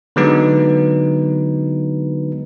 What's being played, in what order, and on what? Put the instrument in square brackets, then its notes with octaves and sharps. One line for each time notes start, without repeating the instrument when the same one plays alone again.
[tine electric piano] D3 F#3 G#3 B3 D#4 B4